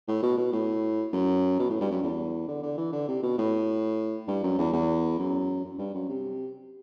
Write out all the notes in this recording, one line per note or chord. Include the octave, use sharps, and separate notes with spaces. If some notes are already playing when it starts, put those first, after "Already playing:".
A2
B2
B2
A2
F#2
B2
A2
G2
F#2
E2
D3
D3
E3
D3
C3
B2
A2
G2
F#2
E2
E2
F#2
F#2
G2
F#2
C3